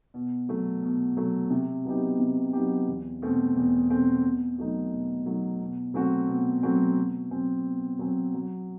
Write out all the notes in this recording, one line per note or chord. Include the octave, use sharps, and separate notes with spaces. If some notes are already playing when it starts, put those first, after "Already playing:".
B2
F#3 A3
B2
F#3 A3
C3
F#3 B3 D#4 G4
C3
F#3 B3 D#4 G4
E2
B2 A3 C4
E2
B2 A3 C4
B2
F#3 A3 D#4
B2
F#3 A3 D#4
B2
F#3 A3 C4 F#4
B2
F#3 A3 C4 F#4
B2
F#3 C4
B2
F#3 C4
F#3